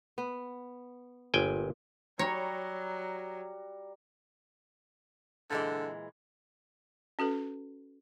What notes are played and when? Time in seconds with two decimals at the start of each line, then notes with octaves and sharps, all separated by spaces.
0.18 B3
1.34 G1 A#2 G5 G#5
2.19 F#3 G3 C#5 A#5
5.50 A#2 D3 E3 G#3
7.19 C#4 F#4 A4 B4